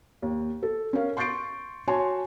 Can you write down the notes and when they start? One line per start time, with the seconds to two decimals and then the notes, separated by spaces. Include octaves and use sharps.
0.22 D#2
0.63 A4
0.93 C#4 A#4 F5
1.17 C6 C#6 G6 A6 C7 D7
1.87 F#4 C#5 G#5 A5 C6